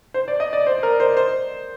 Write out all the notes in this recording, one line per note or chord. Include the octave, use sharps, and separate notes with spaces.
C5
D5
D#5
D5
C5
A#4
C5
C5